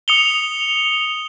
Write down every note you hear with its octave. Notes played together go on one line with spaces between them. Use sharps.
D#6 C#7 F7 G7